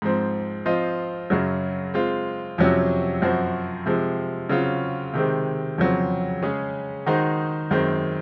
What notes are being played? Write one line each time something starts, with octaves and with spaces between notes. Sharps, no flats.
G#2 F3 C4
F3 C4 F4 C5 D#5
F#2 C#3 F#3
G#3 C4 F4
F2 C3 F#3 C#4 F#4
F#2 F3 C4 F#4
C3 F3 G#3
C#3 F#3 C4 F4
C3 D#3 G#3 C4
F2 C#3 F#3 C4
C#3 G#3 C#4 G#4
D#3 G#3 D#4 F#4 C5
F#2 D#3 G#3 C4